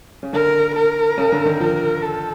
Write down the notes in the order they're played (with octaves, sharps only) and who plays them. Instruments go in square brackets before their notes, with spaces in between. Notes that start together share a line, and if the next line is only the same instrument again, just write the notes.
[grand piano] C#3
[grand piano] D3 [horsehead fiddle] A#4
[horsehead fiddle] A#4
[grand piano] C#3
D3
D#3
[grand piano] F3 [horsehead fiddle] A#4
[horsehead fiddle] A4